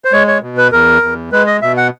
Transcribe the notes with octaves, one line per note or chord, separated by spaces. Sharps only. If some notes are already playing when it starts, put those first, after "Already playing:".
C5
G#3 C#5
C#5
B2
B4
E2 A#4
E2
G#3 B4
D#5
B2 E5
F#5